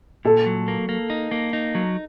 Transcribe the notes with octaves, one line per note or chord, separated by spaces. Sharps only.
A#2 A4
F#3
A#3
A#3
D#4
A#3
D#4
F#3